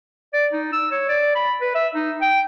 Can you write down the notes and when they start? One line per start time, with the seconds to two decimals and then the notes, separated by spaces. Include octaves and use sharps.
0.34 D5
0.53 D#4
0.73 E6
0.92 C#5
1.09 D5
1.36 B5
1.61 B4
1.75 E5
1.95 D#4
2.22 G5